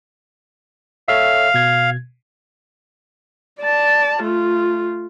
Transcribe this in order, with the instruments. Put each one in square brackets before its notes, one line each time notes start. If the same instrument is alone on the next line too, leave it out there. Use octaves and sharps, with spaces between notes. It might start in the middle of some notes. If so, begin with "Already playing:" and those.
[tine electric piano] A4 C#5 E5 [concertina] F5
[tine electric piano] B2 G#6
[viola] D5 A5
A3 F4